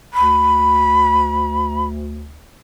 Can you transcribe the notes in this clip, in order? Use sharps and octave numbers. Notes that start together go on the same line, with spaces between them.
D2 B5